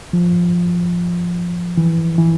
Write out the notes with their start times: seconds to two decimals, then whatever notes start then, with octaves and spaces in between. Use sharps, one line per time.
0.13 F3
1.78 E3
2.18 E3